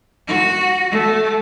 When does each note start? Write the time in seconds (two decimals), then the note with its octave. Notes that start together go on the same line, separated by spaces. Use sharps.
0.28 F#4
0.91 A3